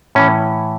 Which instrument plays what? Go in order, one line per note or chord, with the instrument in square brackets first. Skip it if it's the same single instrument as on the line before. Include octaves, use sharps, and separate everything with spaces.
[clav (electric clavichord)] A2 E3 C#4